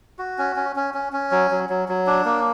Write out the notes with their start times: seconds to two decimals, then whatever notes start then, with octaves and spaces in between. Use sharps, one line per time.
0.19 F#4
0.38 C#4
0.56 C#4
0.76 C#4
0.94 C#4
1.13 C#4
1.31 F#3
1.51 F#3
1.69 F#3
1.89 F#3
2.07 D4
2.25 A#3